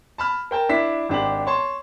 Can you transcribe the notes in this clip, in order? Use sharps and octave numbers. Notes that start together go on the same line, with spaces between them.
A5 B5 F6
A#4 G5 A5
D4 E4 B6
G#1 D4 G4 F#7
C#5 A5 C6